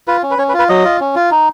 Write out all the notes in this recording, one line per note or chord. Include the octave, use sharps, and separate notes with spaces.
F4 B4
C#4
B4
C#4 C#5
B4
F4
B4
F#3 D#5
F4
C#4
F4
D#4